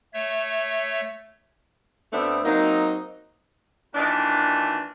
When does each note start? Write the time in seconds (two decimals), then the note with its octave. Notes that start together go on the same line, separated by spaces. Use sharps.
0.14 A3 C#5 E5
2.12 D2 A3 B3 C4 D4 E5
2.45 F#3 A#3 C4 D#4
3.95 A#2 D#3 E3 D4